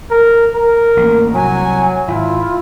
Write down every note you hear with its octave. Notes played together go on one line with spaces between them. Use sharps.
A#4
A#4
A1 A#3
C2 F#3 G#5
G#1 E4 F4